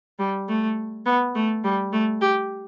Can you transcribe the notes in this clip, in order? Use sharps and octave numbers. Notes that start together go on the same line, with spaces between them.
G3
A3
B3
A3
G3
A3
G4